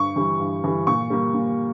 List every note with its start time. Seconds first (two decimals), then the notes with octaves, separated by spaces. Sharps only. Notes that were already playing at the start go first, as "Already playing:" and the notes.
Already playing: G2 C#6
0.16 E3 G3
0.40 G2
0.64 E3 G3
0.87 A#2 C#6
1.10 G3 A#3
1.34 A#2